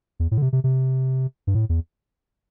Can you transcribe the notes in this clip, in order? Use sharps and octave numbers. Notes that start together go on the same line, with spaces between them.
E2
A2
D3
C3
C3
C3
G2
A2
E2